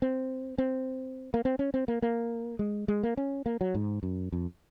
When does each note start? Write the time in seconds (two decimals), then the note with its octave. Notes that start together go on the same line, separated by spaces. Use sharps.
0.02 C4
0.58 C4
1.34 A#3
1.45 C4
1.59 C#4
1.74 C4
1.88 A#3
2.02 A#3
2.59 G#3
2.88 G#3
3.03 A#3
3.17 C#4
3.46 A#3
3.61 F#3
3.75 G#2
4.03 F#2
4.32 F2